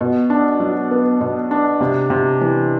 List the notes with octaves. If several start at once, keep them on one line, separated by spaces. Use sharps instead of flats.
B2
D4
F#3
B3
B2
D4
C3
C3
E3